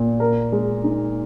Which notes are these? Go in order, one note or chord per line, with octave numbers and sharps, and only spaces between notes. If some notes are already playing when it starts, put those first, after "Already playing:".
Already playing: A#2
A#4
G#3
D#4